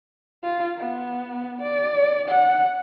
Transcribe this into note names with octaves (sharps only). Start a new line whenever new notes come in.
F4
B3
D5
F#5